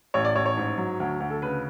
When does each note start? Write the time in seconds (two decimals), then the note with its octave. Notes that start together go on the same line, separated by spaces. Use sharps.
0.14 A1 C#5
0.25 D5
0.35 A1 C#5
0.46 C#5
0.57 G#2
0.77 F#3
1.00 D2
1.20 D2
1.30 A4
1.42 C#3 B4